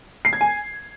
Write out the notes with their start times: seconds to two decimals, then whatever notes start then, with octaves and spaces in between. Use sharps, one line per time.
0.25 C7
0.33 G#6
0.41 G#5